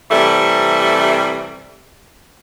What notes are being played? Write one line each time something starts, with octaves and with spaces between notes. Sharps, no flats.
C3 E3 G3 A3